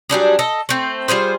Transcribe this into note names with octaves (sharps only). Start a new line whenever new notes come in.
F#3 G3 D4 G#4
A4 D#5
A3 C4
G3 F4 G#4 C5